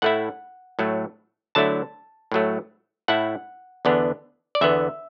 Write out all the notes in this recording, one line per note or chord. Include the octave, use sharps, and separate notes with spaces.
A2 A3 E4 F#5
A2 F#3 A3
D3 F#3 A3 E4 A5
A2 F#3 A3
A2 A3 E4 F#5
E2 D3 B3 D4
D5
E2 D3 B3 E5